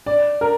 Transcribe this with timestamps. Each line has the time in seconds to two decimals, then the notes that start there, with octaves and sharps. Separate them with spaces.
0.06 D5
0.41 A#4